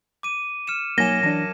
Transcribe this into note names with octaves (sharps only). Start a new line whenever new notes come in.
D6 D#7
F6 C#7 E7
F#2 A#3 D#4 G#5 G#6 A#6 E7
E3 D4 A5